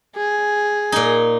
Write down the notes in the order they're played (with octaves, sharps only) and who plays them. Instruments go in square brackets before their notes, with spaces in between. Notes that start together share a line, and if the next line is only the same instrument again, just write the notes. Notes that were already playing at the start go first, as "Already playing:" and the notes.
[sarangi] G#4
[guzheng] A#2 D#4